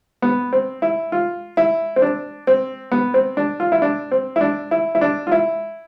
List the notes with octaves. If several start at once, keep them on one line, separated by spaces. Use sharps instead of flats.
B3
C4
E4
F4
E4
C4
D4
C4
B3
C4
D4
F4
E4
D4
C4
E4
D4
E4
E4
D4
F4
E4